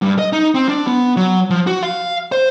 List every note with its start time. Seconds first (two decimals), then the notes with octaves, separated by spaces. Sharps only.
0.02 G2
0.19 D#5
0.33 D#4
0.55 C4
0.69 D4
0.87 B3
1.17 F#3
1.50 F3
1.67 F#4
1.83 F5
2.32 C5